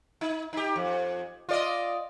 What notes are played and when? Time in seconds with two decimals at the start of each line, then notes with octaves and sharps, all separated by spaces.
0.21 D#4
0.53 D#4 G4
0.76 F2
1.49 F4 D5 D#5